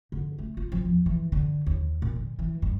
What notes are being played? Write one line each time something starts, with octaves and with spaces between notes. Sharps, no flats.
D3
A3
F4
F3
E2
E3
D3
D#2
A#2
D3
E3
G2